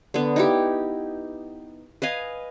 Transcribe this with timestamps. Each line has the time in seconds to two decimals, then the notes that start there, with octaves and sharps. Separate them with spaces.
0.14 D3 B3
0.36 D#4 E4 G4
2.02 B4 D#5 F5 G#5